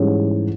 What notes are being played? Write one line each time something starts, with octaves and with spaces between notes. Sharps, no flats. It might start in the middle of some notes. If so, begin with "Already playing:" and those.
Already playing: G#2 E3 G3 C#4